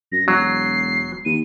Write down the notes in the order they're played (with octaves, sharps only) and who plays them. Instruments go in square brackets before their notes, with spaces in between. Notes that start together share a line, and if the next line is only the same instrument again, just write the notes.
[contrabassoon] F#2 [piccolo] A#6
[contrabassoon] E1 [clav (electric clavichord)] F#3 [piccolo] C7
[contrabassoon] D#2 [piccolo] D#7